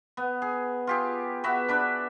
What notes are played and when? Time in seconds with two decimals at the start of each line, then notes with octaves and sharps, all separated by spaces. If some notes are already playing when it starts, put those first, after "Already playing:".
0.17 B3
0.42 G#4
0.87 F4 G4 G#4
1.44 B3 F#4 B4 E5
1.68 D4 B4 B5 D6